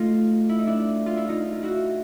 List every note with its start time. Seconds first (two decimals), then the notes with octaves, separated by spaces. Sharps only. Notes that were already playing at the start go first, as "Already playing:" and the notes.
Already playing: A3 D#4 F4
0.49 E4
0.58 D#4
0.67 D4 E4
1.06 F4
1.17 E4
1.29 D#4 F4
1.52 F4
1.63 E4 F#4